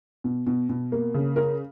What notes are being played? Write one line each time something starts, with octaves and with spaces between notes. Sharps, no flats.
B2
B2
B2
A#3
C#3
A#4